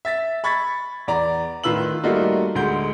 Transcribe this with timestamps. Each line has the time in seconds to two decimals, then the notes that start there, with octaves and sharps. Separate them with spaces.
0.05 E5 A6 B6
0.44 B5 C#6 G#6 A6 B6
1.08 E2 D5 A#5
1.64 A2 D#3 F4 B4 E6 F#7
2.04 G3 A3 A#3 D#4 F4 F#4
2.55 D2 G#3 G6